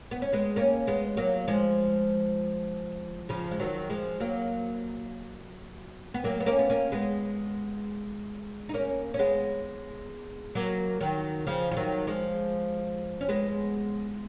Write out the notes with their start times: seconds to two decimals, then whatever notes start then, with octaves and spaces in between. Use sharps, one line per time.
0.11 B3
0.22 C#4
0.33 G#3 B3
0.56 A#3 C#4
0.87 G#3 B3
1.17 F#3 A#3
1.48 F3 G#3
3.29 C#3 F3
3.51 G#3
3.59 D#3 F#3
3.90 F3 G#3
4.20 F#3 A#3
6.14 B3
6.24 F#3 A#3
6.40 B3
6.46 A#3 C#4
6.59 B3
6.70 A#3 C#4
6.92 G#3 B3
8.69 D#4
8.74 A#3 C#4
9.14 C#4
9.19 G#3 B3
10.55 F#3 A#3
11.01 D#3 F#3
11.47 C#3 F3
11.71 F3
11.76 D#3 F#3
12.07 F3 G#3
13.21 C#4
13.29 G#3 B3